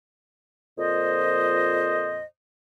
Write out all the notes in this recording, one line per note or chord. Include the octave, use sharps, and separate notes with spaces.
F2 A#2 C5 D#5